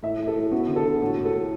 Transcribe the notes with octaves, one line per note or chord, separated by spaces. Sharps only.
A2 E5
A3
A4
A2
B3 F#4
D3
A4
D3
A2 F#4
A2
A4
A2